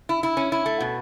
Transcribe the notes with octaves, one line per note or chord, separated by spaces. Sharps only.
E4
E4
C#4
E4
A3
B2